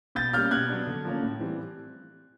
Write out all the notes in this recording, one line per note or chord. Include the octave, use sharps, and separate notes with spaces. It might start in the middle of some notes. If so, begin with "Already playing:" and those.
B2 G6 A6
G3 A#3 C#4 F6 G6
B2 F#6 G#6
F#3 B3 D4
D3
F3 A#3 C#4
A2
E3 G3 C4